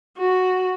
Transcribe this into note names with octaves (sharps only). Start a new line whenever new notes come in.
F#4